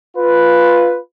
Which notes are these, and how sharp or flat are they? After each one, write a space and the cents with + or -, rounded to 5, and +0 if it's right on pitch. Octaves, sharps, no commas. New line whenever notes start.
F4 +0 B4 +0